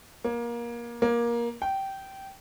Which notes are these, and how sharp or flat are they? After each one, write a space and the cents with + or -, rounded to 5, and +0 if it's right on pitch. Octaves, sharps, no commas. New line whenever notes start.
A#3 +25
A#3 +20
G5 -15